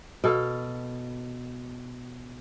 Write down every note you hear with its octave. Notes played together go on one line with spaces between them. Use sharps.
B2 A4 F5